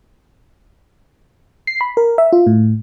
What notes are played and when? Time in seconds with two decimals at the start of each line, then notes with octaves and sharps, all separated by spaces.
1.67 C7
1.81 B5
1.97 A#4
2.18 E5
2.33 F4
2.47 A2